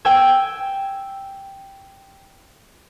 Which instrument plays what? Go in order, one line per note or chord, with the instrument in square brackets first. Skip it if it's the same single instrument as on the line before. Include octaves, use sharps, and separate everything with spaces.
[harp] G5 G#5 E6 G#6